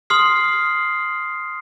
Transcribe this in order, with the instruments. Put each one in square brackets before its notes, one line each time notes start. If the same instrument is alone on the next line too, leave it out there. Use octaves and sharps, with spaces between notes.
[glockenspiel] C6 D#6 F6 C7